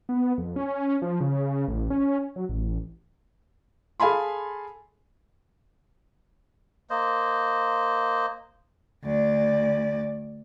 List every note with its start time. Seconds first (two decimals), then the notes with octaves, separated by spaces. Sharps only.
0.09 B3
0.38 F2
0.56 C#4
1.02 F3
1.20 C#3
1.68 A1
1.90 C#4
2.36 F#3
2.49 A1
4.00 G#4 A4 F5 G#5 B5 C6
6.90 A#3 C5 D#5
9.04 D2 D5